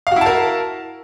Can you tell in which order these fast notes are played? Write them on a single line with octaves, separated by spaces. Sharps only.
F5 F#4 E4 A5 A#4